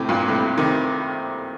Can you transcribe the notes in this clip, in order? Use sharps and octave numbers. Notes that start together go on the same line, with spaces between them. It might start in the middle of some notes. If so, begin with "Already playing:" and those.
Already playing: A2 C3
G2 A#2
A2 C3
C3 D#3